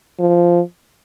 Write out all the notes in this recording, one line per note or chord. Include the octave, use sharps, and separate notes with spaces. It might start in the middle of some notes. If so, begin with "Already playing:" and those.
F3